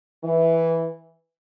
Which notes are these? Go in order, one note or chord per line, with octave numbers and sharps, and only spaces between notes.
E3